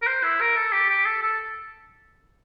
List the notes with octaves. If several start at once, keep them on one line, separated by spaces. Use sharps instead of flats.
A#4
C5
E4
A#4
A4
G4
G4
A4
A4